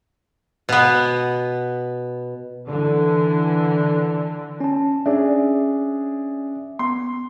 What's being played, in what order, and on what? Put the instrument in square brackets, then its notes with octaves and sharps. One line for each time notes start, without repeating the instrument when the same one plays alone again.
[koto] B2 B3
[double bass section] D3 E3
[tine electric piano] C#4 A5
[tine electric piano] C#4 E5 [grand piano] D4 G#4
[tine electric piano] B3 [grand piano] C6